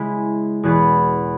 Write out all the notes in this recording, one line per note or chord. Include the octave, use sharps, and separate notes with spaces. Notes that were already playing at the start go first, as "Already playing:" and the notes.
Already playing: C#3 G#3 E4 G#4
E2 B2 B3 G#4 B4